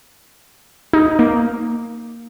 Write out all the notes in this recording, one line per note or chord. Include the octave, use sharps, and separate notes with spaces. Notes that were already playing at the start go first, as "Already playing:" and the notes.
D#4
A#3